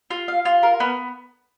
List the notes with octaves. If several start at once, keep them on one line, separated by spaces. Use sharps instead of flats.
F4
F5
F4
A#4
B3